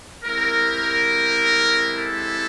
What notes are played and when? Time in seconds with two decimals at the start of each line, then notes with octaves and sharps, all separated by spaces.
0.25 G#3 C4 E4 G4 A#4
1.98 A4